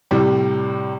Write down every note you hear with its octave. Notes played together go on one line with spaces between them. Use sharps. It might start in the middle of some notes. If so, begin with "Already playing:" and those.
A2 C3 G3